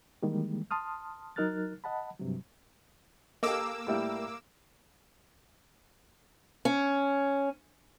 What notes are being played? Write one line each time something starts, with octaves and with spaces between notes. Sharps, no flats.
D#3 E3 G3 G#3 A#3
A5 C6 D#6 F6
F#3 D#4 A#4 F6 F#6 A6
D#5 F#5 A5 B5
G2 C3 F#3
A#3 G4 A4 D#5 D6 E6
A2 G3 E4
C#4